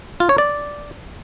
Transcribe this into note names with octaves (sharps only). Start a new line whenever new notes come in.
F4
C#5
D5